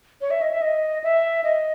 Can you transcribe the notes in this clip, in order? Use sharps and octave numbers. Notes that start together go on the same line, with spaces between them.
C#5
E5
D#5
E5
D#5
E5
D#5